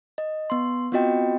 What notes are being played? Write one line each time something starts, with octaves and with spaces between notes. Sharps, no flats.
D#5
B3 C6
B3 C4 F4 F#4 D#5 G5